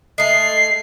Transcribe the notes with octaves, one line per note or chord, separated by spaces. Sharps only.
G#3 A3 C7